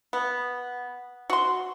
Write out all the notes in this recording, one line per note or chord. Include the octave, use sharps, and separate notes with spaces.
B3
F#4 C6